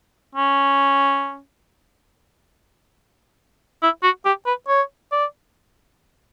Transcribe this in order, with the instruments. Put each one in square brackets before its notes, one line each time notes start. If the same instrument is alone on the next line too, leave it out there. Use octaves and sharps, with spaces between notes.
[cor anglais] C#4
E4
F#4
G4
B4
C#5
D5